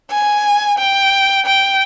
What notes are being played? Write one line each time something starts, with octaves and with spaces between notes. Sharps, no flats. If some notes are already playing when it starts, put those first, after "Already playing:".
G#5
G5
G5